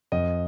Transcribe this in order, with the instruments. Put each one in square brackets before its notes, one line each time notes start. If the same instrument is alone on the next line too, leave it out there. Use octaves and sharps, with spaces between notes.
[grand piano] F2 D#5